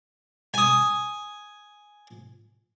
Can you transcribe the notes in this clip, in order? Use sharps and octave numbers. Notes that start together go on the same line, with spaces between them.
G#5 D#6